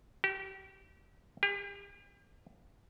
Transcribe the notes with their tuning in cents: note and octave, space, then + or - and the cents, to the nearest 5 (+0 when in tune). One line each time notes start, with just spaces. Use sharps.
G4 -30
G4 +40